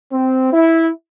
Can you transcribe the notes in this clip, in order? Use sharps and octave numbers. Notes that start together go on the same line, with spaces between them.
C4
E4